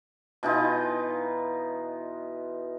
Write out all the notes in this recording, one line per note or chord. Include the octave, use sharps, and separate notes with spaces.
B2 E3 D#4 F4